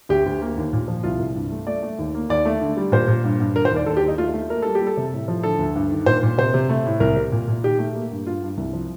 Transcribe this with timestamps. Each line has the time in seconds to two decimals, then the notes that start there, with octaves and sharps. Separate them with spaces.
0.09 D2 G4
0.26 D2
0.42 A#3
0.57 D#2
0.73 A#2
0.88 F3
1.03 C2 F4
1.19 C2
1.35 G2
1.52 A3
1.67 A3 D5
1.82 A3
1.99 D#2
2.15 A#3
2.29 D#2 D5
2.45 A3
2.61 D3
2.77 G3
2.92 A#2 C5
3.08 A#2
3.24 G2
3.40 G2
3.55 D3 A#4
3.65 C5
3.71 D#2
3.76 D5
3.86 D#2 A4
3.97 G4
4.02 D#2
4.08 D#4
4.18 A3 F4
4.34 A3
4.50 A#3 A#4
4.62 G3 A4
4.75 G4
4.81 G3
4.87 A4
4.97 C3
5.13 A2
5.28 F3
5.43 D3 A4
5.59 D2
5.75 G2
5.91 D#3
6.06 A#2 C5
6.23 A#2
6.38 C3 C5
6.54 C3
6.69 A3
6.86 A2
7.00 C2 A#4
7.16 C3
7.32 A#2
7.48 A#2
7.63 D#3 G4
7.79 A3
7.95 A#3
8.11 G2
8.26 G2 F4
8.43 G2
8.57 C2
8.73 F3